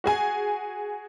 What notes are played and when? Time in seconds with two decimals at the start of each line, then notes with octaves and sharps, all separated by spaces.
0.04 F#4 G#4 G#5